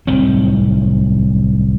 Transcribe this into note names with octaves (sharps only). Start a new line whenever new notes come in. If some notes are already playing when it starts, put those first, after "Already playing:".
D1 C2 D#3 C4